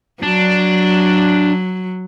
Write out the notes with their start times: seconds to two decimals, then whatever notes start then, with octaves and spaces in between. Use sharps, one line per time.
0.23 F#3 D4